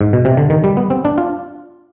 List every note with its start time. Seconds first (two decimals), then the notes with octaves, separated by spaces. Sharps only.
0.01 G#2
0.13 B2
0.25 C3
0.37 D3
0.50 D#3
0.64 G3
0.77 B3
0.90 C4
1.05 D4
1.18 F4